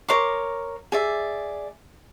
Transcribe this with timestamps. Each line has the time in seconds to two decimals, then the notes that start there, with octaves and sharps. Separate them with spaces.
0.08 A#4 C#5 C6 D6
0.92 G#4 D5 E5